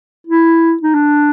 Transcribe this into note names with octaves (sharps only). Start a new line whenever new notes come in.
E4
D#4
D4